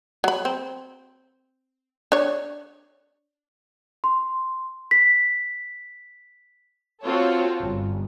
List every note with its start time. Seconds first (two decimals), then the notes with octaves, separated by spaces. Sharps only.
0.24 F#3 B5
0.45 C4
2.12 D4 C#5
4.04 C6
4.91 B6
7.02 C4 F4 F#4 A4 C#5
7.62 G1